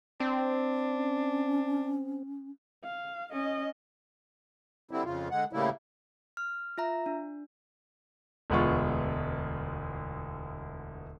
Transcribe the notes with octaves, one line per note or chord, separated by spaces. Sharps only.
C4 D4
C#4
F5
C#4 D#5
D3 G3 C4 E4
F2 C#3 F4
D3 G#3 F#5
A2 C#3 G3 A3 A#3 E4
F6
F4 E5 A#5
D4
E1 D2 G#3 B3 F4 C#6